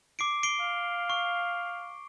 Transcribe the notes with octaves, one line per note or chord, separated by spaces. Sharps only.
D6 C7 D7
C7 D7 G7
F5
C#6